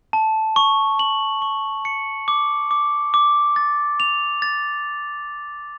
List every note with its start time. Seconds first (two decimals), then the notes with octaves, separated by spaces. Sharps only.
0.13 A5
0.56 C#6
0.99 F#7
1.42 C#6
1.85 C#7
2.28 D6
2.71 D6
3.14 D6
3.56 A6
4.00 F7
4.42 A6